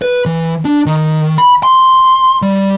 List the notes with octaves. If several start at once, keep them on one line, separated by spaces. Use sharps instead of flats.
B4
E3
D4
D#3
B5
C6
G3